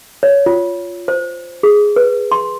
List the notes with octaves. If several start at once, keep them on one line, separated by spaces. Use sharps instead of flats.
C#5
F4
C5
G#4
B4
C6